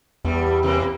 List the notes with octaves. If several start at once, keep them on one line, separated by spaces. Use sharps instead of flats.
E2 G2 G3
C3 E3 A#3